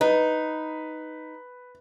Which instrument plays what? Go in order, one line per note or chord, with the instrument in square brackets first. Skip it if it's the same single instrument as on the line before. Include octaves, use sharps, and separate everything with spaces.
[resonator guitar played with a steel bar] D#4 [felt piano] B4